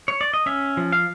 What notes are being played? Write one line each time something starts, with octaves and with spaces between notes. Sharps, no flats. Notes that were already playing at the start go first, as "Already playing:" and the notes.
C#5
D5
D#5
C#4 E5
F3
F5